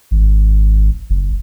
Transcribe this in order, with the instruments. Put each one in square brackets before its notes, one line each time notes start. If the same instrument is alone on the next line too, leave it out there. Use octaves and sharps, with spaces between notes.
[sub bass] G#1
F#1